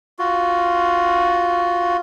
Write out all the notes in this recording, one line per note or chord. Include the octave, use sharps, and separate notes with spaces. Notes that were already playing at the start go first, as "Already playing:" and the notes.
F4 F#4